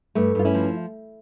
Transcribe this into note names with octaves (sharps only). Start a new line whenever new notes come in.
G2 A3
G2 F4
C#4 E4
F3